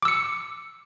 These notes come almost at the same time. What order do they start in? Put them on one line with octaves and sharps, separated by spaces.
D6 E6 C#7